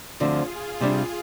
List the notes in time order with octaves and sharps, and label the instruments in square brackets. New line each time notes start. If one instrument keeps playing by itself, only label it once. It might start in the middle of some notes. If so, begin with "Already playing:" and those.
[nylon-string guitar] D2 D3 F3 C4 [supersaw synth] F4 G#4
[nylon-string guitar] C3 G3 D4